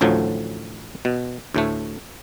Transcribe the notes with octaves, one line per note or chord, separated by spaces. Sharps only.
A1 D2 A2 F3 F#3
B2
D2 A2 A3